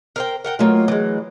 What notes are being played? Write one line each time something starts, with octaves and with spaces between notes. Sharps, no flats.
A#4 C5 G5
A#4 F#5 G5
F#3 A3 A#3 F4 D#5
E3 G#3